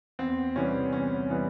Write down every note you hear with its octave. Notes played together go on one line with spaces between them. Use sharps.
E2 C4
C3 E3 G3 B3 C#4
E2 C#4
C3 E3 G3 B3